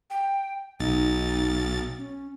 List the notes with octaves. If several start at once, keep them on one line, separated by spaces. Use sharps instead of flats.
G5
B1 D#4 A6
C#4